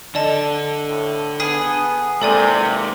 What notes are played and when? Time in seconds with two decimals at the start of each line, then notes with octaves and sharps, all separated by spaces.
0.15 D3 A4 D5 D#5 A5
0.89 A2
1.40 B3 G#4
2.21 G#2 C3 A#3 A4 D5 G#5